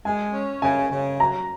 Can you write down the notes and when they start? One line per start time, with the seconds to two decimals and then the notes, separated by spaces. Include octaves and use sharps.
0.05 G#3 G#5
0.34 C#4
0.62 C#3 G#5
0.92 C#3
1.19 F#3 A#5